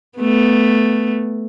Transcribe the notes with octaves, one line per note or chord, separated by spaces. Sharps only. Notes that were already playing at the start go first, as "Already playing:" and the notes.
A3 B3